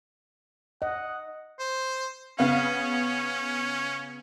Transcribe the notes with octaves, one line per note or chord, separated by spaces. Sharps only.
D#5 F#5
C5
C#3 B3 C#4 F5